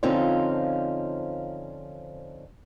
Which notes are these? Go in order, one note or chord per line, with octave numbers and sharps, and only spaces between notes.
D3 F3 C4 C#4 D#4 F4